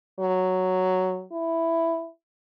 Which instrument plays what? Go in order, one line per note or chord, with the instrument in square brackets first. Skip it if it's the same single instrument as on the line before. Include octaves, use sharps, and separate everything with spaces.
[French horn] F#3
E4